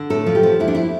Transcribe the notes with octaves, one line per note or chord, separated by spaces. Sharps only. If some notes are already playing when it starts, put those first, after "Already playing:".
Already playing: D3
A2 A4
F3
G4
F3
E2 E4
D4
E4